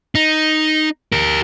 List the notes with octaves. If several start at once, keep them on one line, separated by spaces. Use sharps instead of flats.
D#4
G4 A#4